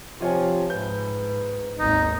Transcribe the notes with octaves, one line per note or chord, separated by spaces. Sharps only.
C3 F3 F4 C#5 G#5
G#2 B4 G6
G#1 D#2 D#4